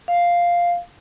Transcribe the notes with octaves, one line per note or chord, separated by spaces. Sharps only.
F5